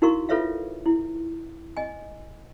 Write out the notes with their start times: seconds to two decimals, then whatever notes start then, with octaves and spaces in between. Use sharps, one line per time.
0.02 D#4 E4 F#4 A#4 F5 C#6
0.29 F4 A4 B4 C#5 E5 F5
0.86 E4
1.77 D#5 G#5